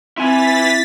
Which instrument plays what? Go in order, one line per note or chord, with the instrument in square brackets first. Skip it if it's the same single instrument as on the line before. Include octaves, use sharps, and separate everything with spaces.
[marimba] C4 [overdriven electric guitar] E4 G#5 [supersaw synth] A6 B6